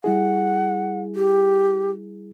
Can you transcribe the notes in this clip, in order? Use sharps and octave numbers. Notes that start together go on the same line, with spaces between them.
G3 E4 G#4 F#5
G4